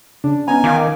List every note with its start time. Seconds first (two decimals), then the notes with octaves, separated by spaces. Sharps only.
0.24 C#3 D4
0.48 B3 C#4 D#4 G#5 A#5
0.64 D#3 F4 F5 D6